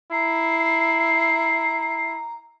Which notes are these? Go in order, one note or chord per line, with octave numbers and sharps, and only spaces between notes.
E4 A#5 C7